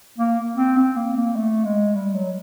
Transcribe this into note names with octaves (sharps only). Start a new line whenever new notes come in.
A#3
C4
C4
A#3
A#3
A3
G#3
G3
F#3